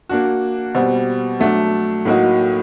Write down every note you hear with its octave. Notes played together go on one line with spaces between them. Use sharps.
A#3 D4 F#4
B2 G3 C4
F#3 A3 D4
A2 F#3 A#3 D#4 F#4